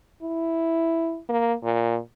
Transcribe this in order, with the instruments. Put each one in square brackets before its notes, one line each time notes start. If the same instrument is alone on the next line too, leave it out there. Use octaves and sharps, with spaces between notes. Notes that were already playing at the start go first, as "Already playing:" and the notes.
[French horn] E4
A#3
A#2